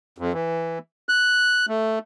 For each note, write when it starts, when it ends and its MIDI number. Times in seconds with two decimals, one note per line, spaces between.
0.18 0.33 41
0.33 0.79 52
1.09 1.66 90
1.68 1.99 57